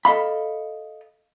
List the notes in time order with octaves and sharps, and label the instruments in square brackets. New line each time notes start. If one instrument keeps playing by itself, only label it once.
[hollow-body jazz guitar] A4 D#5 F5 B5